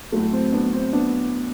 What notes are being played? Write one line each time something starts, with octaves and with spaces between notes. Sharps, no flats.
A2 F#3 A3
C4
B3 D4
C4
B3 D4